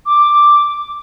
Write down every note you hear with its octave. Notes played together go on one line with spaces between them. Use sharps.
D6